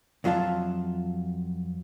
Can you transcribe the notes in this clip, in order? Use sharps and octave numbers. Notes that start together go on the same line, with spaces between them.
F2 F#3 F4 E5 A5